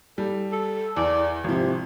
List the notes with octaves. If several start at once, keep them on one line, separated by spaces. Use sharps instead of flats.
G3 A4
A4
E2 D5
G#1 C3 F3